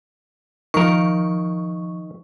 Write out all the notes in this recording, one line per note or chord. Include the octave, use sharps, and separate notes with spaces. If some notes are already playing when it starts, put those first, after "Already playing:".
D#3 F3 A#4 C#6